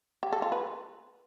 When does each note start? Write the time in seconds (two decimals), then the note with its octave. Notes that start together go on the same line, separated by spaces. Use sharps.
0.23 G4
0.33 A4
0.42 F4
0.52 B4